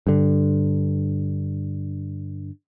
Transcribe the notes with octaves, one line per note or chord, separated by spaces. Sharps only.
G2 D3